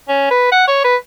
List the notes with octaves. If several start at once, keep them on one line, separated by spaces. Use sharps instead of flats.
C#4
B4
F#5
C#5
B4